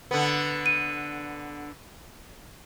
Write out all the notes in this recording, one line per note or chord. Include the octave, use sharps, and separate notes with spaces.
D3 B3
D#7